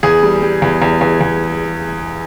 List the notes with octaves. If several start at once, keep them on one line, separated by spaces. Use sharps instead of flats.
E2 G#4
G3
G3
E2
E2
E2
E2